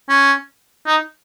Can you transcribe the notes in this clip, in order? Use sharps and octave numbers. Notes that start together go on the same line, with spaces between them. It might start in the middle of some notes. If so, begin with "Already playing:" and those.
C#4
D#4